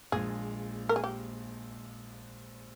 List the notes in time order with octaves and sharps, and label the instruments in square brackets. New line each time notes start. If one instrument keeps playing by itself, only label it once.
[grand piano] A#1 A#2 G#3 [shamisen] G#4
[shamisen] A#4
G#4
G4